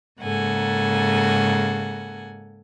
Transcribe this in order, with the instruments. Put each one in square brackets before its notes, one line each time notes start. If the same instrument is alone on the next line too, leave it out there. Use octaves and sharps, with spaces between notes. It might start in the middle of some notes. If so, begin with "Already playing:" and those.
[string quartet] G#2 C#3 A#3 A4 F#5 G#5